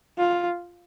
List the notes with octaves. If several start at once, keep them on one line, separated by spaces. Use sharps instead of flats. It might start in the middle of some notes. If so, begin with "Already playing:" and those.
F4